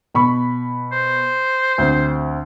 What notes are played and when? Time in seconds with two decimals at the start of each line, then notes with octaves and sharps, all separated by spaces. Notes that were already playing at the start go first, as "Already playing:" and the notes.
0.14 B2 B5 C#6
0.92 C5
1.78 D2 C4